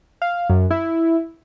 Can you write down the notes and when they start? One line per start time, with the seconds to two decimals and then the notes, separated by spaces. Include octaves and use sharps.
0.22 F5
0.49 F#2
0.71 E4